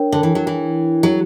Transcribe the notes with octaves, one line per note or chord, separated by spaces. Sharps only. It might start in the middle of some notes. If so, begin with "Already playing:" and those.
Already playing: D4 A#4 C#5 G5
D3
E3
F#3
E3
F#3